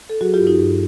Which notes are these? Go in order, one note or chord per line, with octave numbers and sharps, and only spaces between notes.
A4
F#3 F#4 G#4
F4 G4
G2
D#4 F4
G2